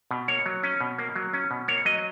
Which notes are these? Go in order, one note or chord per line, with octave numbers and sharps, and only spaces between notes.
B2
A#3 C#5
F#3
C#4
B2
A#3
F#3
C#4
B2
A#3 C#5
F#3 D#5